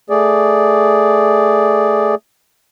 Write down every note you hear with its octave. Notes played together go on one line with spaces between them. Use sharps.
A3 G#4 D5